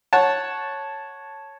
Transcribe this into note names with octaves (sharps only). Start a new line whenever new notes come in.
C#5 F#5 A5